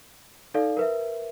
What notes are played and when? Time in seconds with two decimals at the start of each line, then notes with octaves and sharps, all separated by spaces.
0.54 D#4 A4 D5 F5
0.77 A#4 B4 E5